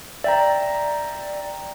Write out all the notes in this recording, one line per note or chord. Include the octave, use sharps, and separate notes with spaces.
D5 E5 G5 A#5